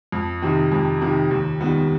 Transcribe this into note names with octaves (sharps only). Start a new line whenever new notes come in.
F2
C3 D#3
F2
C3 D#3
D#2
D#3 G3 B3